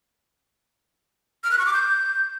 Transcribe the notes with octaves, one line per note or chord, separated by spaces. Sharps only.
F6
F#6
C#6
D6
G6